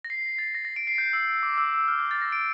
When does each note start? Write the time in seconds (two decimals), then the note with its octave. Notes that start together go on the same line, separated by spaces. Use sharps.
0.05 A#6
0.10 C7
0.39 A6
0.55 A#6
0.65 A#6
0.76 D7
0.87 C7
0.98 G6
1.13 E6
1.43 D6
1.58 E6
1.74 E6
1.88 F6
1.99 G6
2.11 A6
2.21 A#6
2.32 D7